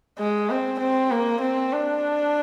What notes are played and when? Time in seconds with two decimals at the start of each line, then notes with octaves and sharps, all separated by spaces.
0.18 G#3
0.49 C4
0.80 C4
1.11 A#3
1.41 C4
1.73 D4